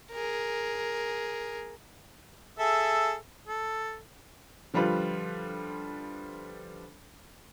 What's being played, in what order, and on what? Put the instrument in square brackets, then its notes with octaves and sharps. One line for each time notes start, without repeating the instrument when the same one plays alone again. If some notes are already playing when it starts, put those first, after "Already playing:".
[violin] G#4 A#4
[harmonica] G#4 A4 E5
A4
[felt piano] D3 F3 G3 F4 B4